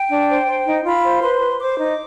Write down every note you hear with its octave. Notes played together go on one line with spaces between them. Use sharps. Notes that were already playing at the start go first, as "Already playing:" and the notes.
Already playing: G5
D4
C5
C5
D#4
F4 B5
C5
B4 C6
B4
C5 D6
D#4